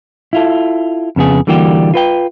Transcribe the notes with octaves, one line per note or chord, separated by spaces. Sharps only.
E4 F4 A4
F2 C#3 B3 G#4
D3 E3 G3 A#3 F#4 G4
F4 B4 G5